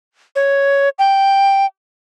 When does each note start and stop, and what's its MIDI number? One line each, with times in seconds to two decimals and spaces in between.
0.36 0.89 73
0.99 1.66 79